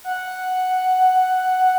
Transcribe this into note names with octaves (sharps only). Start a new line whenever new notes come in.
F#5